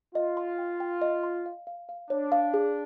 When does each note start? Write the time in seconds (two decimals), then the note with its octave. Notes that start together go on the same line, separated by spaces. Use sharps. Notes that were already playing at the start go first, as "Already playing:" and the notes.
0.15 F4 D#5
0.37 C6
0.58 G5
0.80 G5
1.02 D#5
1.23 C6
1.46 F5
1.67 F5
1.89 F5
2.10 D4 C#5
2.32 F5
2.54 G#4